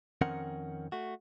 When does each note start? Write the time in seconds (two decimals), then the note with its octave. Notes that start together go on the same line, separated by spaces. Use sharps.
0.21 F2 D#3 C4 C#4 A#4 F#5
0.92 A3 F#4